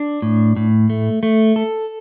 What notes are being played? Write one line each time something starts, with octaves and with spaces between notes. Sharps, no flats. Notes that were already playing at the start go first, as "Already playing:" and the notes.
Already playing: D4
A2
A2
A3
A3
A4